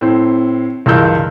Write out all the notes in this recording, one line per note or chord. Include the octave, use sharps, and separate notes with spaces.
A2 C4
C#2 G2 E3 A#4 E6 G6